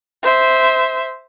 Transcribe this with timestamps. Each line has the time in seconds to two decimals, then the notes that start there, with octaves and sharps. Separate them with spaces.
0.23 C5 E5